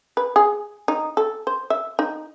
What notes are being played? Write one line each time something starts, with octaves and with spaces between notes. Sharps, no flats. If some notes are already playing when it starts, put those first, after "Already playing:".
B4
G#4
D#4
A4
C5
E5
D#4